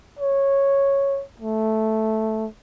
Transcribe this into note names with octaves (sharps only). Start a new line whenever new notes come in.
C#5
A3